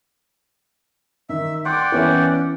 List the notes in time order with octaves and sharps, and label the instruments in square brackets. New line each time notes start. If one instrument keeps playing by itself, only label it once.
[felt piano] D#3 [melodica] E5
[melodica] D5 F#5 G5 [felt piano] C6 D6
[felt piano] E3 B3 C#4